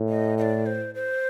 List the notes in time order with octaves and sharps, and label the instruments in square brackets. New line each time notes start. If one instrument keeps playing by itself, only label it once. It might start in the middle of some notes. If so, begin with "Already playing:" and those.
Already playing: [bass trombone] A2
[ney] D#5
D#5
D5
C5
C5